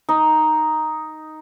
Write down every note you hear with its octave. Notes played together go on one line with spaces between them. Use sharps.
D#4